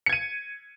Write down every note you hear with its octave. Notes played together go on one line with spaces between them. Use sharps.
G#6 C#7 D#7